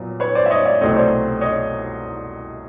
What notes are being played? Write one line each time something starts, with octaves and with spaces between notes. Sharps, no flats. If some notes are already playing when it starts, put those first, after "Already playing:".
Already playing: A#2 F#3 B3
B4 C#5
C5 D5
E5
C#5 D#5
D5 E5
C2 B2 F#3 A3 C4 C#5 D#5
C5 D5
C#5 D#5